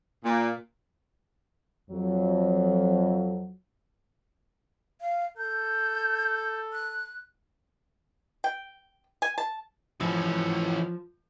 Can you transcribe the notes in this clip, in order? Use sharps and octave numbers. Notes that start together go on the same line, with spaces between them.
A#2
F2 F#3
F5
A4 G6
F#6
G5
G#5
A5
E3 F3 C#4